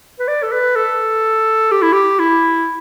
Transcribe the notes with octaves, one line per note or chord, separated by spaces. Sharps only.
B4
D5
A4
B4
A4
G4
E4
G4
E4